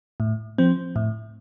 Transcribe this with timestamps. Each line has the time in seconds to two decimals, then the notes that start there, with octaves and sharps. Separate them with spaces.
0.20 A2
0.58 F3 C4
0.96 A2